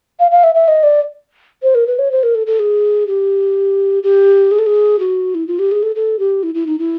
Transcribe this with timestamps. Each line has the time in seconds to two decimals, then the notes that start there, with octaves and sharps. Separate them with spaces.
0.19 F5
0.31 F5
0.43 E5
0.55 E5
0.68 D#5
0.83 D5
1.63 C5
1.75 A#4
1.87 B4
1.99 C#5
2.11 C5
2.23 A#4
2.35 A4
2.47 A4
2.59 G#4
3.07 G4
4.03 G4
4.51 G#4
4.59 A4
4.66 G#4
4.99 F#4
5.35 E4
5.47 F4
5.59 G4
5.71 G#4
5.83 A4
5.96 A4
6.19 G4
6.43 E4
6.55 E4
6.67 D#4
6.79 E4